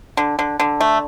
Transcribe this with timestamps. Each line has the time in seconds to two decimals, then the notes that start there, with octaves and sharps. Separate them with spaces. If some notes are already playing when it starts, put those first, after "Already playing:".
0.17 D3
0.39 D3
0.60 D3
0.81 A3